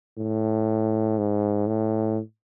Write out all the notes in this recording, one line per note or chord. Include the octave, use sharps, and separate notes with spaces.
A2
G#2
A2